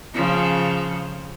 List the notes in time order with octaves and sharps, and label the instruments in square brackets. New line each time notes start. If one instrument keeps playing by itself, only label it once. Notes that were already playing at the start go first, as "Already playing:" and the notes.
[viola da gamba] C#3 F3